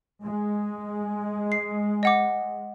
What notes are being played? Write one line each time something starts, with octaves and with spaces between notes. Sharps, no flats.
G#3
C7
D#5 F#5 D6